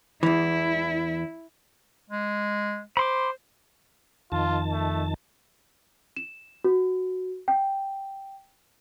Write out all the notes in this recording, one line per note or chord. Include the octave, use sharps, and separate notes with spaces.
E2 E3 E4
G#3
C5 B5 C6 D6
F2 D#3 F4 A5
A3
E7
F#4
G5